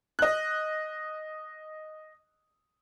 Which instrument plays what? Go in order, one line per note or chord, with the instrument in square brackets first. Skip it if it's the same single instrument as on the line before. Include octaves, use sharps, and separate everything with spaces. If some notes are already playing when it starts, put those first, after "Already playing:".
[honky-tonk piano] D#5 F#6